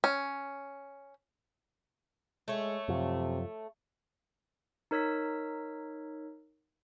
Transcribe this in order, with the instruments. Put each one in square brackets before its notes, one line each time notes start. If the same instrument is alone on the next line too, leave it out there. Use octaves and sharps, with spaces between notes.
[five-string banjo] C#4
[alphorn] G#3 [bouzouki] A3 C#5
[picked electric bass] F#2 F3 [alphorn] C3
[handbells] D#4 A#4 C#5 E6 B6